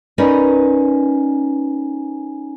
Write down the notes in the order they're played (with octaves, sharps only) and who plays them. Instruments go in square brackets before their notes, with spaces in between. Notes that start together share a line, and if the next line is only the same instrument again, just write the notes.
[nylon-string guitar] C#4 D#4 A#4 B4 D5 D#5